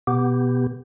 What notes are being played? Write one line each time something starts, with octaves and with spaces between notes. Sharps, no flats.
B2 B3 G4